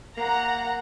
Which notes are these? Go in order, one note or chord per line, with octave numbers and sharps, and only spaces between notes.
A#3 F#5 A#5